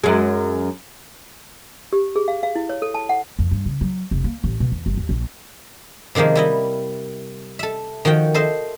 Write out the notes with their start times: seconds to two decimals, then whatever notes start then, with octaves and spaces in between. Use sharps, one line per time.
0.04 F#2 G#3
1.93 G4
2.16 G#4
2.28 F5
2.43 F5
2.56 E4
2.69 C#5
2.82 A4
2.94 A5
3.09 F#5
3.39 F2
3.51 G2
3.66 C#3
3.81 F#3
4.11 F1
4.24 A#3
4.44 A1
4.60 B2
4.72 E2
4.86 G1
4.97 D#2
5.09 A#1
6.15 C3 D#3 F3 G#3 A#3
6.35 G3 E4 D#5
7.59 A4 E5
8.05 D#3 F3 F#4 G5
8.34 A4 C5 D#5 E5